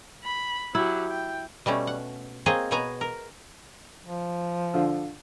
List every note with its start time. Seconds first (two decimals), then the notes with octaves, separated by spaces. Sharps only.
0.24 B5
0.75 F#3 E4 G4
1.10 G5
1.66 B2 G3 A3 C#4
1.87 F#5
2.46 A#3 C4 G#4 C#5 D#5
2.71 B2 B3 C#5 G#5 A#5
3.01 A#4
4.05 F3
4.74 D3 F4